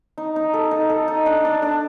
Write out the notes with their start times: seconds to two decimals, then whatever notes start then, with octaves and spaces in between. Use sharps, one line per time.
0.18 D#4
0.36 D#4
0.54 A4
0.71 D#4
0.90 A4
1.08 D#4
1.26 D4
1.45 D4
1.62 D4